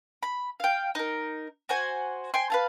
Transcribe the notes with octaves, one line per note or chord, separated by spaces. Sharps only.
B5
F5 G5
D#4 A#4
F#4 C5 G#5
C5 G5 G#5 C6
B4 F5 A5